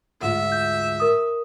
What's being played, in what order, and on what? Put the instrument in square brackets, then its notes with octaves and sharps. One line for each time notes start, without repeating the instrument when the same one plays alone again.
[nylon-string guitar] D2 G#2 F4 [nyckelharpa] E5
[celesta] G6
A#4 D#6